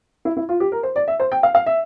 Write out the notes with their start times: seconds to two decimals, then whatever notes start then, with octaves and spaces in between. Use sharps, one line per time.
0.25 E4
0.37 E4
0.49 F4
0.60 G4
0.72 A#4
0.83 C5
0.96 D5
1.08 E5
1.20 C5
1.32 G5
1.43 F5
1.55 F5
1.66 E5